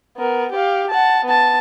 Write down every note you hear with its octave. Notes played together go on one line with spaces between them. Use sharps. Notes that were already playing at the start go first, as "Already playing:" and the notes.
B3 A#4
G4 F5
F#5 A5
B3 A5